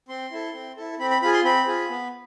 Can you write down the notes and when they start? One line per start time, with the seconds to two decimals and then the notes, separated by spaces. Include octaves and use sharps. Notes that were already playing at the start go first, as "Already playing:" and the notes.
0.08 C4 C6
0.31 E4 A4
0.54 C4
0.77 E4 A4
0.99 C4 B5
1.10 B5
1.22 F4 G#4 B5
1.33 C6
1.44 C4 B5
1.67 F4 G#4
1.90 B3